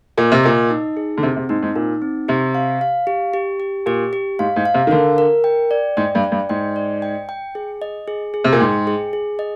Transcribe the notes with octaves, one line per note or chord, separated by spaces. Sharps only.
A#2 D#5
C3
A#2 D#5
D#4
G#4
D3
C3 C4
C3
G#2 D#4
G#2
A#2 D#4
C4
C3 G4
F5
F5
G4
G4
G4
A#2 G4
G4
G#2 F5
G#2
F5
C3
D#3
D3 A#4
A#4
G5
D5
G#2 G5
G2
D5
G2
G#2 G5
D5
G5
G5
G#4
D#5
G#4
G#4
C3
A#2
G#2 G5
G#4
G#4
D#5